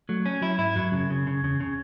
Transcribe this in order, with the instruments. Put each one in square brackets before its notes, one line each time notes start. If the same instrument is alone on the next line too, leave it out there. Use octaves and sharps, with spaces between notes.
[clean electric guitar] F#3 [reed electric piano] A3
[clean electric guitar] C#4
[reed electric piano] F#3 [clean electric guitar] E4
[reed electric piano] G#2 [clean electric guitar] E4
[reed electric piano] F#2 [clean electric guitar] F#3
[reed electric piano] F#2 [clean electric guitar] C#3
[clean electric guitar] C#3
C#3
[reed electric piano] E2 [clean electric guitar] C#3
[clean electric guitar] C#3